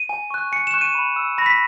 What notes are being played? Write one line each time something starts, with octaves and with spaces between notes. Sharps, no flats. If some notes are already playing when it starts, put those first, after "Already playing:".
Already playing: D#7
G#5
C#6 F#6
G#5 C#7
E7
C#6 F#6
D#7
B5
E6
B5 A#6
B6